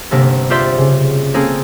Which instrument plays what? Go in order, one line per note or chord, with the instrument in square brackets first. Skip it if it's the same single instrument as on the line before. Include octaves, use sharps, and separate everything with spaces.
[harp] G1 C3 A#3 A4
F4 G4 C5 D5 E5 C6
C#3
A#3 C4 C#4 G#4 A4